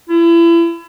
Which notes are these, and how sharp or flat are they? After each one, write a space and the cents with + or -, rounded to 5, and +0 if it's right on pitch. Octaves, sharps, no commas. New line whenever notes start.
E4 +35